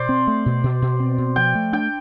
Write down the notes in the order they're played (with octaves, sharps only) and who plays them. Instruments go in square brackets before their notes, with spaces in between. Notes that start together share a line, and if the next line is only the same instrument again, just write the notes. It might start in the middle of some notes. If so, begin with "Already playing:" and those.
Already playing: [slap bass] B2 [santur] C5 D5
[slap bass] C4
A3
B2
B2
B2
C4
B2
[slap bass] F3 [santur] G5
[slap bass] A3
[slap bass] D4 [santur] G5